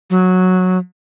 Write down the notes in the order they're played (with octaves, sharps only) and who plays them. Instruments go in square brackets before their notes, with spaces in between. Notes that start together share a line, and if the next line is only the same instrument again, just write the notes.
[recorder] F#3